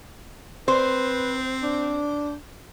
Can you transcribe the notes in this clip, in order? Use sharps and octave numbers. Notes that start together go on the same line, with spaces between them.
C4 B4 C5
D4